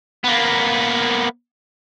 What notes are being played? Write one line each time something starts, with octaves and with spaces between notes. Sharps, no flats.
A#3 B3